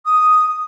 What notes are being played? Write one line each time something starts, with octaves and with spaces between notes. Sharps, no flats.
D#6